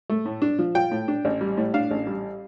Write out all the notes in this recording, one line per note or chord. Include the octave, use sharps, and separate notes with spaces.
A3
A2
D4
F3
F4 G5
A2
D4
A1
G3
A2
D4 F5
A1
G3